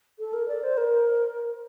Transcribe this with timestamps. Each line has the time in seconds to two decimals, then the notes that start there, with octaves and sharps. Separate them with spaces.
0.19 A4
0.33 A#4
0.48 D5
0.64 C5
0.77 A#4